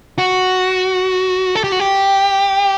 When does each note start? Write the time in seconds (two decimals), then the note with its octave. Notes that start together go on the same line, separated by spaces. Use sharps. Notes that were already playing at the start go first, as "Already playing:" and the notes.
0.18 F#4
1.55 A4
1.64 G4
1.72 F#4
1.80 G4